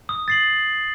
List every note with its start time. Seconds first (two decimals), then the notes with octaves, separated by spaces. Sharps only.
0.09 D#6
0.28 A6 C7 F#7